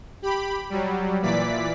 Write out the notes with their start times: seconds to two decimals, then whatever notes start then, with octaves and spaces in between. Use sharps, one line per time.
0.22 G4 B5
0.70 F#3 G3
1.22 A#2 E3 D5 B6